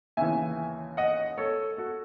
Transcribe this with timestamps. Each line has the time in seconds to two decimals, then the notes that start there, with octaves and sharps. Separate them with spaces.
0.17 D#2 C#3 E3 E5 G#5
0.97 D#5 F#5
1.38 A4 C#5
1.77 F#4 A4